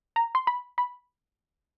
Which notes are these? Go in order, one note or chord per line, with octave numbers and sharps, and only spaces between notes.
A#5
C6
B5
B5